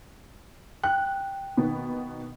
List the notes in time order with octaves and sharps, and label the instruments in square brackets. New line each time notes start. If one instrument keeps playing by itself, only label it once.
[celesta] G5 [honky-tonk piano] F#6
[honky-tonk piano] B2 D#3 B3